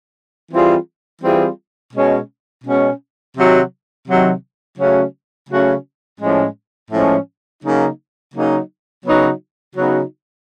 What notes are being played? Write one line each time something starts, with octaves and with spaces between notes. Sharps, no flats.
E3 G3 C4 F4 G#4
E3 G3 C4 F4 G#4
B2 G#3 C#4
B2 G#3 C#4
C3 D#3 F#3
C3 D#3 F#3
C#3 F#3 A3 C#4 F#4
C#3 F#3 A3 C#4 F#4
A2 F3 G#3 C#4
A2 F3 G#3 C#4
C#3 F#3 A#3 D#4
C#3 F#3 A#3 D#4
C#3 F#3 B3 D#4 F#4
C#3 F#3 B3 D#4 F#4